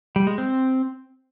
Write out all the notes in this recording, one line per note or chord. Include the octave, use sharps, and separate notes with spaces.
G3
G#3
C4